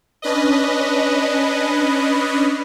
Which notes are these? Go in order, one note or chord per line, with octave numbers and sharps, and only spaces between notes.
C#4 D4 B4 D#5